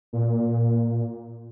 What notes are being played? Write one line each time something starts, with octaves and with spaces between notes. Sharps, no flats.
A#2